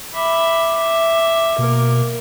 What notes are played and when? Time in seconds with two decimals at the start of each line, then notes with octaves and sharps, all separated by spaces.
0.15 E5 B5 D6
0.77 E5
1.58 B2 A#3 A#4